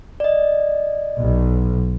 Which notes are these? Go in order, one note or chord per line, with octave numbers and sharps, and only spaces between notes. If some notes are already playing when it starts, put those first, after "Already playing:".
D5 D#5
B1